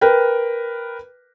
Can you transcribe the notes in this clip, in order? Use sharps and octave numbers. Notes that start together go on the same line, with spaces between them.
A#4 B4 G5